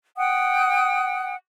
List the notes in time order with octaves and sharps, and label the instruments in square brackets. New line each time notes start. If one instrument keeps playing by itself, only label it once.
[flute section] F#5 G5 D#6